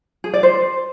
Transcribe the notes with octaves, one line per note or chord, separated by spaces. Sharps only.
G#4
D5
C5